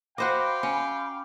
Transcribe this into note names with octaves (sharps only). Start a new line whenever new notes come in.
F#4 C5 D#5 F5 G5 B5 D6
C#4